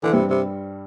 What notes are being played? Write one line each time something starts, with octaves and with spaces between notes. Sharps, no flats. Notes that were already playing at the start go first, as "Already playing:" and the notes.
D3 E3
G2 C3 G3
C3